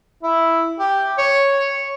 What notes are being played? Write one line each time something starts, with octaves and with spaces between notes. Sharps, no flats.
E4
G4
C#5